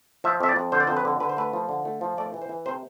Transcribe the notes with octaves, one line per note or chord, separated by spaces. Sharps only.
F3 E5
F2 E5
D5
F2
D3 C5
D5
F2 C5
B4
D3
D3 B4
C5
A3 B4
F3
D3
A3
F3
A3 D5
E3
C5
E3
C3 C5